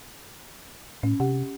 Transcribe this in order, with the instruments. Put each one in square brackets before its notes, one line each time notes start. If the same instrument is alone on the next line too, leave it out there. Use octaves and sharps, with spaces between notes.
[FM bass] A2 [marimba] C#4
[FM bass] C3 [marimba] G4 F#5